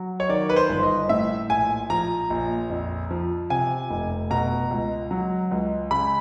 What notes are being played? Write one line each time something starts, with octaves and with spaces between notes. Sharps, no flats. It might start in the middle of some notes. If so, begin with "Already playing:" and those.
Already playing: F#3
C#5
D#3 D5
B4
C5
G1
D#5
A2 E5
A#1 G#5
F3 A#5
A#1
F2
F3
C3 G#5
F1
B2 A#5
C#2
F#3
C#2
C#3 B5